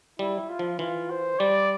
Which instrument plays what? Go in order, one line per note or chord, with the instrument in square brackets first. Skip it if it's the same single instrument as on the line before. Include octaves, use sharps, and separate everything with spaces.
[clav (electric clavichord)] G3 [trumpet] E4
[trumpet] F4
[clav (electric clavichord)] F3
[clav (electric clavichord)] E3 [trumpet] F4
[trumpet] C5
[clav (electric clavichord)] G3 [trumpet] D5